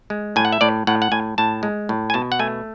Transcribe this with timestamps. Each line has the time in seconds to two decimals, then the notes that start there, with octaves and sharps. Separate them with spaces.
0.10 G#3
0.36 A2 G#5
0.45 F#5
0.52 E5
0.61 A2 D5
0.87 A2 F#5
1.02 F#5
1.12 A2 G#5
1.38 A2 A5
1.63 G#3
1.89 A2
2.10 G#5
2.14 B2 A5
2.32 F#5
2.39 A3 G#5